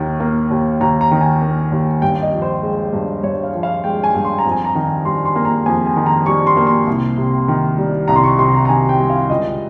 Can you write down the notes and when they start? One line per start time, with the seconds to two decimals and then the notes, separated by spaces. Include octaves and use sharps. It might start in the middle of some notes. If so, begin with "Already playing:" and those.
Already playing: D#2 D#3
0.20 A#3
0.51 D#2
0.81 D#2 A#5
1.01 A#5
1.11 D#3
1.21 G#5
1.42 A#3
1.72 D#2
2.02 G2 G5
2.22 D#5
2.33 F3
2.42 C5
2.63 G#3
2.93 G2
3.23 G2 C#5
3.44 F5
3.53 F3
3.63 F5
3.84 G#3 G5
4.04 G#5
4.14 G2
4.25 C6
4.39 A#5
4.45 F2
4.52 G#5
4.65 A#5
4.75 D#3
5.05 G3 C6
5.25 C6
5.36 A#3
5.45 A#5
5.66 F2 G#5
5.87 G#5
5.96 D#3
6.06 A#5
6.26 G3 C#6
6.47 C6
6.57 A#3
6.67 C6
6.87 C2
7.18 C3
7.48 D#3
7.78 G3
8.08 C2 A#5
8.16 C6
8.24 C#6
8.38 C3 C6
8.55 A#5
8.65 A#5
8.69 D#3 G#5
8.89 G5
8.99 G3
9.10 F5
9.30 C#2 D#5